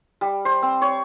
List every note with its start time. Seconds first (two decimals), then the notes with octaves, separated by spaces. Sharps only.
0.21 G3
0.45 C5
0.62 C4
0.82 C#5